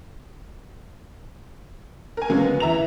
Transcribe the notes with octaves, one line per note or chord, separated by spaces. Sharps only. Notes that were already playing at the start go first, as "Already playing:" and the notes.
A#4 G#5
C#3 F#3 G#3 A#3 B3 C#4
B3
E3 E5 A#5 F7